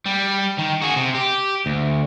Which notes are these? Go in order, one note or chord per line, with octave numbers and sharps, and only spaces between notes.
G3
D#3
F#4 G#4
C3
G4
D2